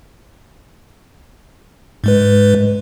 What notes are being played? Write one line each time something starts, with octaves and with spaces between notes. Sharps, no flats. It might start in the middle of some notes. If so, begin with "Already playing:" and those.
G#2 G#3 B4